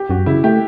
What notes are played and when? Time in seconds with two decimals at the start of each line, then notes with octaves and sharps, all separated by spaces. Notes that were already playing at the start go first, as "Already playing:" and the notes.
Already playing: G4
0.10 F#2 F#4
0.26 C#3 E4
0.44 A3 G4